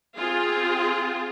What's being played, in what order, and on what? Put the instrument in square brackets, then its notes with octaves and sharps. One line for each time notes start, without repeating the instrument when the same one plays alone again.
[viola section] C4 F4 G#4